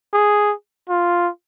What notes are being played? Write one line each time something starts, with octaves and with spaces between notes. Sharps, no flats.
G#4
F4